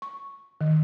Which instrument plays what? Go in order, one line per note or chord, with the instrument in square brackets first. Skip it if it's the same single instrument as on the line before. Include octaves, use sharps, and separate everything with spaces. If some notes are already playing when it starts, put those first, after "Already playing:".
[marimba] C#6
D#3